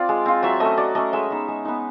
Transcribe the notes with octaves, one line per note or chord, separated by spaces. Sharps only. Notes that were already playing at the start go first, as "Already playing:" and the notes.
Already playing: C4 F4 D5
G#3
C4 F4
F#3 E5
A3 C#4 D#5
F#3 D5
A3 C#4 D#5
G#3 E5
B3 D#4
G#3
B3 D#4